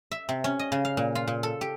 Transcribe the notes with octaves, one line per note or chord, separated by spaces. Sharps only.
E5
C3
C#4
D#5
C#3
F5
A#2
F4
A#2
A4
G4